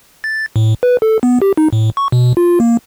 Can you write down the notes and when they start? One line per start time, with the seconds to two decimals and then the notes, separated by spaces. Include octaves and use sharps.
0.24 A6
0.56 A2
0.83 B4
1.02 A4
1.23 B3
1.42 G4
1.57 D#4
1.73 A2
1.97 C#6
2.12 B2
2.37 F4
2.60 A#3